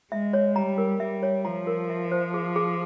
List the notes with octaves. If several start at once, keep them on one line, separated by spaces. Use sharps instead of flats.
G#3 E5
C#5
G3 A#5
A#4
G3 E5
C#5
F3 A#5
A#4
E5
C5
G#4
G#4